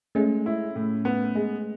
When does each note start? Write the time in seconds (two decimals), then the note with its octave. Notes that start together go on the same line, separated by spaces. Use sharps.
0.15 G#3 A3 C#4
0.46 E4
0.76 A2
1.05 B3
1.35 G#3